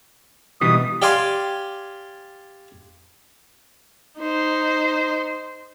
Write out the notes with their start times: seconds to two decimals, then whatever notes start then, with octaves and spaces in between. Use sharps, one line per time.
0.61 B2 E3 G3 D#6
1.02 G4 D5 F5 G#5 C6
4.20 D#4 C5